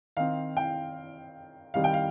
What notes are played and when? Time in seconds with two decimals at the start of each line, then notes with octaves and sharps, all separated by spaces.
0.17 D#3 C4 F5
0.57 G5
1.74 D#3 G3 C4 F5
1.84 G5
1.94 F5